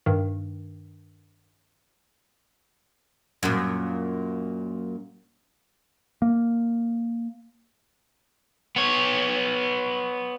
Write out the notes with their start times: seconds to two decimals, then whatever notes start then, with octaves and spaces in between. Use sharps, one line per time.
0.06 G2 D#3
3.43 F#2 A#2
6.22 A#3
8.76 B3 C#5